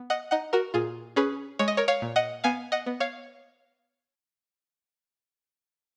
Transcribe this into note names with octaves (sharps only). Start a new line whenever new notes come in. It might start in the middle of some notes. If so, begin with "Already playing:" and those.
Already playing: B3
D#5 F#5
D#4 D#5 F#5
F#4 A#4
A#2 F4 G#4
C#4 G#4 B4
G#3 C#5
D#5
A#4 C#5
C#5 F5
A#2
D#5 F#5
B3 F5 G#5
D#5 F#5
B3
C#5 F5